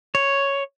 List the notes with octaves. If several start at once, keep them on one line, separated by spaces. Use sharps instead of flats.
C#5